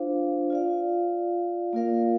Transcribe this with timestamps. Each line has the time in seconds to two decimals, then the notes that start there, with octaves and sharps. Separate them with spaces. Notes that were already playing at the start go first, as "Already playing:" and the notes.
Already playing: D4 F4 C5 F5
0.50 F4 D5 F5
1.73 A#3 F4 A#4 D5 F5